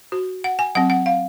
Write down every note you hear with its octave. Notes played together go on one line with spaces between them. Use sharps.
F#4
F#5
G#5
F#3 C4 F#5
F#5
F5